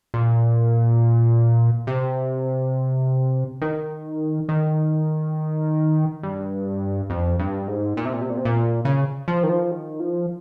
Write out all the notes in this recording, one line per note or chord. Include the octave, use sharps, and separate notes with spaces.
A#2
C3
D#3
D#3
G2
F2
G2
G#2
A#2
C3
A#2
C3
A#2
C3
A#2
C#3
F3
D#3
F3
D#3
F3